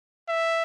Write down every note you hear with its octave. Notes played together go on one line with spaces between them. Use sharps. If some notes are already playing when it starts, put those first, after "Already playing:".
E5